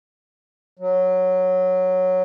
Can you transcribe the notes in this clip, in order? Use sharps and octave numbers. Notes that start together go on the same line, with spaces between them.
F#3